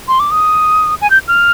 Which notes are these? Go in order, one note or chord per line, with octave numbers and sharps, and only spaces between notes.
C6
D6
D#6
G#5
G6
F6